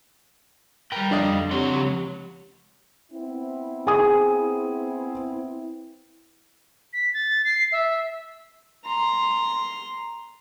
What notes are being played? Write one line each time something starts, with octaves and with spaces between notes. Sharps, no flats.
G3 A#4 B4 G5
F2 D3 D4 D#5 F5
C#2 F3 C4 G4 C#5 F#5 C6
B3 C4 E4
G#4 G#5 D#6
B6
A6
C7
E5
A#5 C6